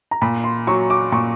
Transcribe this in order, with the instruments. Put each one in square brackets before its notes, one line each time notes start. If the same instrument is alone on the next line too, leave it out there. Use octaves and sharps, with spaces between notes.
[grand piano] A#5
[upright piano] A#2 [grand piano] B5
[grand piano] C6
[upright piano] F#3 [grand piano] C#6
[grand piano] D6
[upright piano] A#2 [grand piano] C#6